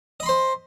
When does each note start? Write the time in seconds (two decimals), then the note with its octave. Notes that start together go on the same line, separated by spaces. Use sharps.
0.20 D#5
0.23 B5
0.26 C6
0.29 C5